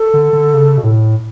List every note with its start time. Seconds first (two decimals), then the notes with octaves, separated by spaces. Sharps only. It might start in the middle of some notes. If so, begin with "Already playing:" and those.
Already playing: A4
0.14 D3
0.33 D3
0.54 C#3
0.78 B2
0.83 A2